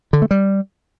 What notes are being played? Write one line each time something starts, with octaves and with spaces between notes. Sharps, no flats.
D3
A3
G3